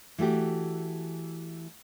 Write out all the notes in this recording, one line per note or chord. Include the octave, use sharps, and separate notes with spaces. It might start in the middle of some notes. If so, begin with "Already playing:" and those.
E3 A3 F#4 G4